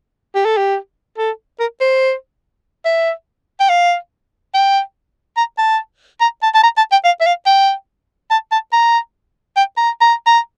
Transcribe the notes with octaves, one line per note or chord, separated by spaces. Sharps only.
G4
A4
G4
A4
A#4
C5
E5
G5
F5
G5
A#5
A5
A#5
A5
A5
A#5
A5
G5
F5
E5
F5
G5
A5
A5
A#5
G5
A#5
A#5
A#5